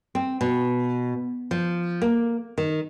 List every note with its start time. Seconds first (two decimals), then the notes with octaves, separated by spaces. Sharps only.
0.15 C4
0.41 B2
1.51 F3
2.02 A#3
2.58 D#3